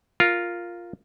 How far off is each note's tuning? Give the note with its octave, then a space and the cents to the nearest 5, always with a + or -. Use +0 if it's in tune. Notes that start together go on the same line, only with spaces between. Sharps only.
F4 +0 A#4 +0